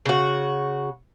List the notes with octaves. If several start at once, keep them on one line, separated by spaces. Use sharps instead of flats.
C#3 F#4